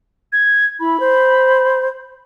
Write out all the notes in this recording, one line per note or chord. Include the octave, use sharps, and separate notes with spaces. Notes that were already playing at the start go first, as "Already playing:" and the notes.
G#6
E4 B5
C5